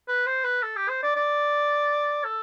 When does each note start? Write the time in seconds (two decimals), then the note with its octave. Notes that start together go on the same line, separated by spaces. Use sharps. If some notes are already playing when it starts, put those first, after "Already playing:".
0.08 B4
0.26 C5
0.44 B4
0.63 A4
0.76 G4
0.89 C5
1.03 D5
1.16 D5
2.25 A4